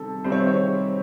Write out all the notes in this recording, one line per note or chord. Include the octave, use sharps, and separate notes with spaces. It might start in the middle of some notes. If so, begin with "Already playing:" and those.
Already playing: C3 D#3 G3 A4
C3 D#3 G3 C4 D#4 C5
C#5
C5
C#5
C5